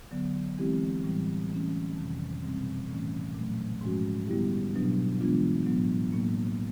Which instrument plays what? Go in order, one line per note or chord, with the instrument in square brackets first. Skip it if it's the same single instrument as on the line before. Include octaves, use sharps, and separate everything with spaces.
[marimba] D3 F#3 B3
E3 G#3 C4 E4 G4
A2 E3 G3
E3 A3 C#4
F2 C3 D#3
B2 G3 C4
A2 E3 A3 C#4
A#2 F#3 A3
G#2 F3 G#3 C#4 F#4
D3 G3 B3 E4 G4
B2 F#3 B3 D4
E3 G#3 B3 D4 F4
A2 F#3 B3
A2 F#3 A#3